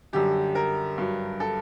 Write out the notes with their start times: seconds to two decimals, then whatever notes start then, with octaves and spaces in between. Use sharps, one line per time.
0.13 F#2 D3 G3 G4
0.55 A#4
0.98 G2 F#3
1.40 A4